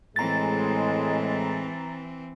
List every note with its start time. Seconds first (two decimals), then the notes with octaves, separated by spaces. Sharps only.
0.16 A2 E3 G#3 C4 A#5 A6